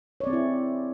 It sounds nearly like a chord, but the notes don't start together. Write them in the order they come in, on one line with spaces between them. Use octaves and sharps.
C#5 D5 C4 G#4 E4